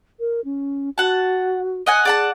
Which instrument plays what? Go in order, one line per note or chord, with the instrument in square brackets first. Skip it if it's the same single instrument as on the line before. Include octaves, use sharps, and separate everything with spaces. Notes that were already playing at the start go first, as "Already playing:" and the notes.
[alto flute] A#4
C#4
[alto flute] F#4 [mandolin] F#5 A5
[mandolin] D#5 F#5 G#5
[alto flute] G#4 [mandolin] D5 F#5 A5